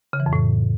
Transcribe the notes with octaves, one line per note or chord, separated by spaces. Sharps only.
C#3
E3
F2
A2